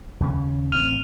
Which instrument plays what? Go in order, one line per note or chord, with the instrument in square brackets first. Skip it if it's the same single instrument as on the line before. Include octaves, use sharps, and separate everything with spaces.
[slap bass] D#2 C#3 C#4
[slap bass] A1 C4 [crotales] F6 D#7 F7